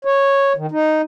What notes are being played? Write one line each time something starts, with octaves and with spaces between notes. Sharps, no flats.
C#5
D#3
D#4